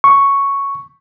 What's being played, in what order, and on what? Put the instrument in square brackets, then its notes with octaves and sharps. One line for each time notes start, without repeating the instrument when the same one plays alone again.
[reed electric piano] C#6